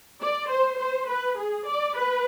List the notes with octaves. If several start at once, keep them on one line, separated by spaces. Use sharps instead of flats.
D5
C5
C5
B4
G#4
D5
B4